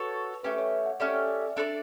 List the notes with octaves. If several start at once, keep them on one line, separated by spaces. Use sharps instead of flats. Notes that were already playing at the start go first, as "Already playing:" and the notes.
Already playing: F#4 A4 B4 C#5
A3 C#4 G4 B4
C#5
F#5
A3 C#4 G4 D5
C#5
D5
D5
E5
D4 A4 D5 E5